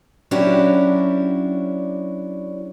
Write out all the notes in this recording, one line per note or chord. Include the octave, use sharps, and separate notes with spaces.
F#3 C#4 D4 E4 F#4 G4